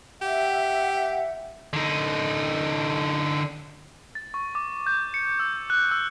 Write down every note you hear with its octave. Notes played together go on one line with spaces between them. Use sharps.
G4 E5 F#5
D3 D#4
A6
C#6
D6
G6
C#7
E6
F#6
E6